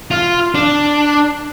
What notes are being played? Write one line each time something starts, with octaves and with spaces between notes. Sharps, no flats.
F4
D4